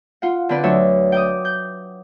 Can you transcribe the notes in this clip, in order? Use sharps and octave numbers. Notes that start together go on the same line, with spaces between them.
F4 F#5
D3 C4 B4 D5
D2 F#3 D4 C#5 E5
G5 D6 D#6
G6